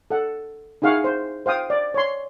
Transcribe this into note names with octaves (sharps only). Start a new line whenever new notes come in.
A4 F#5
D#4 E4 G#4 F5 F#5 C#6
C5
C5 F5 G5 D#6
D5
C#5 C6